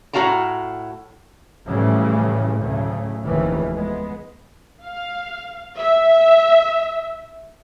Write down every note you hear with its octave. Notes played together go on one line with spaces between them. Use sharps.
A2 F#4 F5 A5 A#5
A2 C#3 E3 F3 G3 A3
D2 A2 C#3 F#3 A3
F1 D#2 C#3 E3 F3
G#3 B3
F5
E5